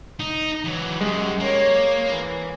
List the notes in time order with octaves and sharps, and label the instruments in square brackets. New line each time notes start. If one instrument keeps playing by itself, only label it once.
[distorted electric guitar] D#4
E3 F#3
[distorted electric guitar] F#2 [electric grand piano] G#3 [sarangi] G4
[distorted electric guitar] A#3 [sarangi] C#5
[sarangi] E3